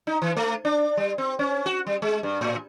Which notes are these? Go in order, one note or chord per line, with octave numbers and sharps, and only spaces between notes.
D#4
E3
A3
D4
G3
C4
C#4
F#4
G3
G#3
G2
A2